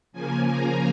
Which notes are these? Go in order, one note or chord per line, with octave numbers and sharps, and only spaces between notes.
C#3 F3 A#3 G#5
A#5